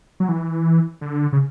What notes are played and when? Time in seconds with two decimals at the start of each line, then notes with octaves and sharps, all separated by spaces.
0.20 F#3
0.29 E3
1.01 D3
1.33 C#3